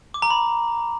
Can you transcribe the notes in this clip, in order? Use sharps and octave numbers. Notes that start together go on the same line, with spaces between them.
D6
A#5
B5